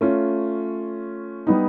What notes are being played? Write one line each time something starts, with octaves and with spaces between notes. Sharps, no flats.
A3 C#4 F4
G3 B3 D#4